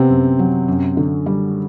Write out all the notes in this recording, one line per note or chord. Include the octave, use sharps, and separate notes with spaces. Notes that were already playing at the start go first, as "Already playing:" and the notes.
Already playing: C3 B3 C4
F#2
F#3
F#2
D3
G3